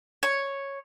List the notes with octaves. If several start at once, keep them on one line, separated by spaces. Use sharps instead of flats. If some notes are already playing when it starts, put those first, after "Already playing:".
C#5